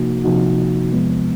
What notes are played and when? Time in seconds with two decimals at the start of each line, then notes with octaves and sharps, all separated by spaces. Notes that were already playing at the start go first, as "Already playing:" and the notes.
Already playing: C3 F3 A#3 D#4 F#4
0.24 C3 F3 A#3 D#4 F#4
0.92 E2 C3 F3 G#3 B3